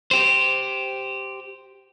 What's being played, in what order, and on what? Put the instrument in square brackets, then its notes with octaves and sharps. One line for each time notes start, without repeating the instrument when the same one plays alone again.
[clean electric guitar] G4 C5